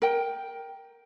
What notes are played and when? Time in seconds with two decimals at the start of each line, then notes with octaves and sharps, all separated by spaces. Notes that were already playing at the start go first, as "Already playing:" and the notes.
0.02 A#4 G5